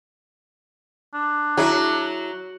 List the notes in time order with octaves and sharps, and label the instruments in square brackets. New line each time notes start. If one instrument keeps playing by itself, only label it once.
[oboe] D4
[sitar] F#3 [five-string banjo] E4 G#4